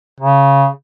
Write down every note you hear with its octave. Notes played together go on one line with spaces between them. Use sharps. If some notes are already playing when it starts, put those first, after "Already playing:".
C#3